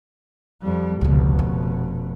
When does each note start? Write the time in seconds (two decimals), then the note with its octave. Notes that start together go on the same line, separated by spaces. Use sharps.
0.62 F2 G3
1.01 F1 C#2 B2 D3
1.39 C#4